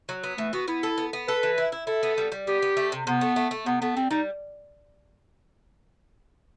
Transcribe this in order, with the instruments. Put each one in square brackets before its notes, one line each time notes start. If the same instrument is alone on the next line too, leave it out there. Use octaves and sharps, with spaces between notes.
[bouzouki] F#3
B3
[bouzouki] E3 [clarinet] A3
[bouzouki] B3 [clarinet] F#4
[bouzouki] B3 [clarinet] E4
[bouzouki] A4
B3
B3
[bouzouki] A4 [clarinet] B4
[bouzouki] E3
E4
E4
[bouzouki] E4 [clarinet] A4
[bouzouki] B3
G3
G3
[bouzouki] B3 [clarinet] G4
[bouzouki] B3
A3
C3
[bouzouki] C3 [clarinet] B3
[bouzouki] A3
A3
A3
[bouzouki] C3 [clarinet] B3
[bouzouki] A3 [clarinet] B3
[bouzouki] G3 [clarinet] C4
[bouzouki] G3 [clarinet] D#4